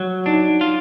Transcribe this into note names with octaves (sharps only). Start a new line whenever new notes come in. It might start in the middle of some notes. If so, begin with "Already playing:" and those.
Already playing: F#3
D4 D#4
F4